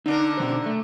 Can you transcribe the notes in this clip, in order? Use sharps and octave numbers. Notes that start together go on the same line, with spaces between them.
D3 D4 D#4 A#4
B2 D#3 C5
A3